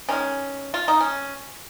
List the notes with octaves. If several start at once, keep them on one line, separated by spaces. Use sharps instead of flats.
D#3 G#3 C#4
F4
D#4
C#4